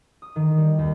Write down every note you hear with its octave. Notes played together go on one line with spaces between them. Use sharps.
D#6
D#3
G3
D#2